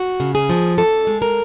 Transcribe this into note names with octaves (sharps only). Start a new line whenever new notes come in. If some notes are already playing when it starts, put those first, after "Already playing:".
Already playing: F#4
C#3
G#4
F3
F2 A4
G#3
A#4